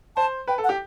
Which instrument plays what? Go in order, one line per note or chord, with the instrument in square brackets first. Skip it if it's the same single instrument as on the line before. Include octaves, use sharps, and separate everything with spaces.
[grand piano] C5 [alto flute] A5
[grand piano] B4 [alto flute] G5
[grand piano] A4
[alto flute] F#5
[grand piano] G4